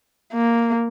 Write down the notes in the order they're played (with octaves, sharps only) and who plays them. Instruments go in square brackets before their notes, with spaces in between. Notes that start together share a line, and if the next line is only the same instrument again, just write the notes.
[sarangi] A#3